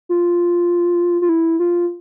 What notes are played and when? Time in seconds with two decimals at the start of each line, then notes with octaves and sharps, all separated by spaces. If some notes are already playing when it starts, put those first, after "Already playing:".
0.09 F4
1.22 F4
1.29 E4
1.59 F4